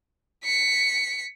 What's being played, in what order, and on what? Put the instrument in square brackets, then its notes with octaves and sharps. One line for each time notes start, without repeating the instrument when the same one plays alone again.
[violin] B6 C#7